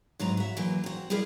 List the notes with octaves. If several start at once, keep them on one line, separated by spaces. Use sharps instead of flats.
G#2 F#3 B4 A#5
F#4 E5
E3 F#3 A#3
C4 F#4
G3 E4 G#4 A#4 B4